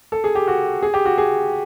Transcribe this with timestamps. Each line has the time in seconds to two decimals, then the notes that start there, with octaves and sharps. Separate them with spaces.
0.12 A4
0.24 G#4
0.35 G4
0.48 F#4
0.83 G#4
0.94 G4
1.05 F#4
1.18 G#4